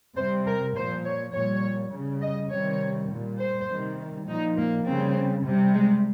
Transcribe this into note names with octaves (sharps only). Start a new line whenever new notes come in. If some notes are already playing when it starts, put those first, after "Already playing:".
C3 G3 C5
A#4
A#2 F3 C5
C#5
A#2 G3 C#5
C#3 G3
D#5
C3 D#3 G3 C#5
A#2 G3
C5
C3 D#3 G3
A#2 F3 D#4
A#3
C#3 G3 C4
C3 G3
G#3